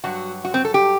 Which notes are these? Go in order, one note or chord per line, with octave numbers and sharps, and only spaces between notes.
G2 F#3 F#4
F#4
C4
A4
G4